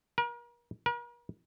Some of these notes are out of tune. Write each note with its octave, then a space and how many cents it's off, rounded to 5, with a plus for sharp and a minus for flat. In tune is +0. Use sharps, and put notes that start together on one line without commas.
A#4 +40
A#4 +45